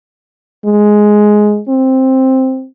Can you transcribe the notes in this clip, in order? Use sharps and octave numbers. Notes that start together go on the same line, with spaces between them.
G#3
C4